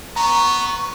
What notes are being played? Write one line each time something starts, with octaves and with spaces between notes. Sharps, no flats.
B3 A#5 C#6